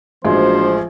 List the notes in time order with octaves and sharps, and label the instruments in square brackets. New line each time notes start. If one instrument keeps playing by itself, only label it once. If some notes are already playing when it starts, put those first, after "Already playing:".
[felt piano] A1 G#3 [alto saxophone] F3 [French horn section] A#3 D4 F#4 [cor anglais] C5